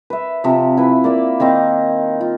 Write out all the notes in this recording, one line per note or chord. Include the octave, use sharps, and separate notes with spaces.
B4 E5
C3 F3
E4 B4
A#3 D5 E5
D#3 A#3 C4 D#4
F4